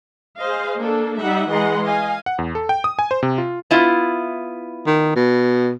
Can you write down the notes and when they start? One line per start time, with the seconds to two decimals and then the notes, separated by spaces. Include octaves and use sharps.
0.41 G#4 C5 D#5 F5
0.78 A#3 D4 A4
1.19 G3 D#4 E5 F#5
1.49 E3 G#3 D#5 F#5 A#5 C6
1.85 D#5 F5 G#5
2.26 F#5
2.39 E2
2.55 A4
2.69 G5
2.84 D#6
2.99 G#5
3.11 C5
3.23 C3
3.38 F4
3.71 B3 E4 F4
4.86 D#3
5.16 B2